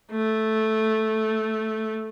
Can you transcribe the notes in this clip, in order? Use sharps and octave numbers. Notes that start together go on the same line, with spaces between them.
A3